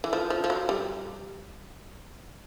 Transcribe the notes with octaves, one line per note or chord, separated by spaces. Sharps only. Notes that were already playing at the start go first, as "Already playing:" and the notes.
E3
F3
F3
F3
F#3
G3